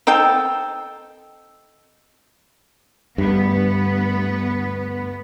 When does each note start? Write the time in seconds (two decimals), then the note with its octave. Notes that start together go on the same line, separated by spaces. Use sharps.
0.07 C4 D#4 A4 G5
3.18 D2 G2 B3 B4